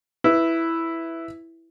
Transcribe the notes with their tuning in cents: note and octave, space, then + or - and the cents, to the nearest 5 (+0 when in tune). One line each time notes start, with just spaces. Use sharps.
E4 +0 B4 +5